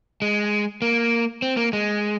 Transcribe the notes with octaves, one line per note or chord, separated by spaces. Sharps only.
G#3
A#3
C4
A#3
G#3